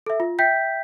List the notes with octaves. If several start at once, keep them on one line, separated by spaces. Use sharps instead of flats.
A4 E5
F4
E5 G5 G6 B6